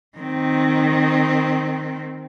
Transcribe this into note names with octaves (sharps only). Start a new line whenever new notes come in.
D#3 C4